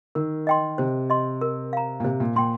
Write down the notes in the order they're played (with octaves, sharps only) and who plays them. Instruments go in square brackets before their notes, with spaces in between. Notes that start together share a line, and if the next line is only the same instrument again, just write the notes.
[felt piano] D#3 [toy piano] A#4
[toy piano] D#5 G5 C6
[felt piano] C3 [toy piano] C5
[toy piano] D#5 C6
A#4
F5 A#5
[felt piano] A#2
[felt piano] C3 [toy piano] C5
[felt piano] A#2
[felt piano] A#2 [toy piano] G5 C6